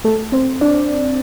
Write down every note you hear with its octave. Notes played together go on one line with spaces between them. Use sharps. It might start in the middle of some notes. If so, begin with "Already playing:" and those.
A3 A4
C4 C5
D4 D5